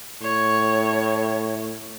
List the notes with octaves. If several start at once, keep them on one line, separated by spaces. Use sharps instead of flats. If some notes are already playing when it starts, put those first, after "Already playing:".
A2 C#5